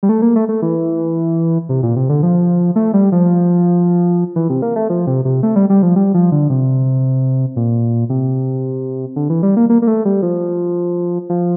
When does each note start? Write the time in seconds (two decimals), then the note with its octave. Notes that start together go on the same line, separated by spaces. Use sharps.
0.03 G3
0.09 A3
0.22 A#3
0.36 A3
0.49 A3
0.62 E3
1.69 C3
1.83 A#2
1.96 C3
2.09 D3
2.23 F3
2.76 A3
2.94 G3
3.12 F3
4.36 E3
4.50 C3
4.62 A#3
4.76 A3
4.90 F3
5.07 C3
5.25 C3
5.43 A3
5.56 G3
5.70 G3
5.83 F3
5.96 G3
6.14 F3
6.32 D3
6.50 C3
7.56 A#2
8.10 C3
9.16 D3
9.30 E3
9.43 G3
9.57 A#3
9.70 A#3
9.82 A#3
9.87 A3
10.05 G3
10.22 F3
11.30 F3